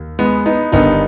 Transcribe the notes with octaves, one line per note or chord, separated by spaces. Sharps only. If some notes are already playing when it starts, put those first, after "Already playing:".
Already playing: D#2
G#3 B3
B3 D#4
G1 G2 D#3 B3 D#4